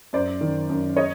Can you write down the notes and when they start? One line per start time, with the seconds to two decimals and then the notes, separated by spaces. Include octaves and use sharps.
0.13 F#2 C5 D5
0.41 D#3
0.70 F#2
0.96 C#5 D#5